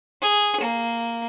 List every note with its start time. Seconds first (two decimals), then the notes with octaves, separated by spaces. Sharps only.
0.22 G#4
0.61 A#3